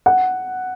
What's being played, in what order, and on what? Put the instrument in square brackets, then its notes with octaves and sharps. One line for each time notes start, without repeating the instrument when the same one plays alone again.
[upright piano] F#5